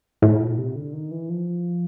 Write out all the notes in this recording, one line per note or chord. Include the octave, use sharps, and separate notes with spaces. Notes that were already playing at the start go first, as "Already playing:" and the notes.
A2
A#2
C3
D3
D#3
E3
F3